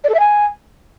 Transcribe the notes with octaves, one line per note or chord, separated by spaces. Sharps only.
D5
A4
E5
G#5